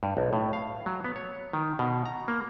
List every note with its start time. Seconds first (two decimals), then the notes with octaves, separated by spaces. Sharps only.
0.03 G2
0.17 B1
0.33 A2
0.53 F5
0.86 F#3
1.04 B3
1.16 C#5
1.53 D#3
1.79 B2
2.06 A#5
2.28 A#3